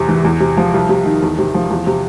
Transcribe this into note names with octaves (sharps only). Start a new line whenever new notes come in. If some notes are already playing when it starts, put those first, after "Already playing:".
Already playing: E2 C3
E3
E2
C3
F3
C2
C3
D#3
E2
C3
F3
E2
C3